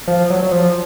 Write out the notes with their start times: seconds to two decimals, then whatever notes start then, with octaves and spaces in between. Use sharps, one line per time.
0.08 F3
0.30 F#3
0.43 F#3
0.52 F3